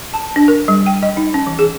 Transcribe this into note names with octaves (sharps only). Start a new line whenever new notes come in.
A5
D4
A#4
G3
G5
D#5
D#4
C#4
E3
G#4